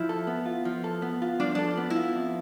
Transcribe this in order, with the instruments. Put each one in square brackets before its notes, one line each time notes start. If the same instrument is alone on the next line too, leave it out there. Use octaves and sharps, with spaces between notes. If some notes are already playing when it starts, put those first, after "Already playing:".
Already playing: [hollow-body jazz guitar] F3 [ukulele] E4
[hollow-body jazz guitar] A4
B3
F4
F3
A4
B3
F4
[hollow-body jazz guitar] F3 [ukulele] D4
[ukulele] D4 [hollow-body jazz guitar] A4
[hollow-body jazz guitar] B3
[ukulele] E4
[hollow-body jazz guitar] F4
F2